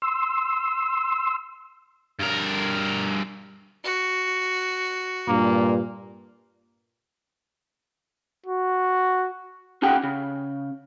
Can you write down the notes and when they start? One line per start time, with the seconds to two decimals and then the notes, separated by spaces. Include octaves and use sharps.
0.02 C6 E6
2.20 G2 A#4
3.84 F#4
5.28 G2 A#2 A#3
8.46 F#4
9.82 C#4 D#4 G4 F#5 G5
10.04 C#3